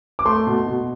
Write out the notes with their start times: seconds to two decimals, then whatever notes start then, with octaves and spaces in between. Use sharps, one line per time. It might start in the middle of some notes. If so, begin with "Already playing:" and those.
0.19 D6
0.25 A3 C6
0.47 B2
0.67 B2